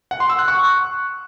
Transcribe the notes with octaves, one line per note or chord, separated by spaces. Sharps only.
F#5
C6
E6
F#6
C#6